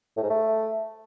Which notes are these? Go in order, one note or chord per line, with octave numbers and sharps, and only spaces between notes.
A2
G#2
A3